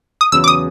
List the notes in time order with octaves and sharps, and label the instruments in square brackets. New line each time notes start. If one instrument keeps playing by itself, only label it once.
[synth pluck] D#6
[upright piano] E2 C#3 F#3 [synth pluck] E6
[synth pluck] D6
D#6